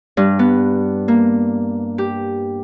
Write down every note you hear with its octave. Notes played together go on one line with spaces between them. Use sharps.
G2
B3
A#3
G4